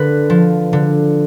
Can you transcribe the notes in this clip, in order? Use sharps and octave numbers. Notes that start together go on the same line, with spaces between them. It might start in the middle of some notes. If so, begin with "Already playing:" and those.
Already playing: D3 B4
F3
D3